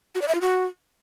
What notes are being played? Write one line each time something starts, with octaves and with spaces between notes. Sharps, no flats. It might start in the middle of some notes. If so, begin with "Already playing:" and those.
F#4
D5
E5
F4
F#4